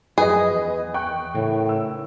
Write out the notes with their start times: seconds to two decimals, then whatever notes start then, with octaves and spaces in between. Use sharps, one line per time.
0.18 F#2 F3 G#4 B4 D#5
0.53 E2
0.94 G5 C#6 F#6
1.35 A2 C#3 E3 A#4
1.69 E6